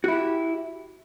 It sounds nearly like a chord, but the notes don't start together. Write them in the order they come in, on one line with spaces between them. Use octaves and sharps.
F#4 E4 G4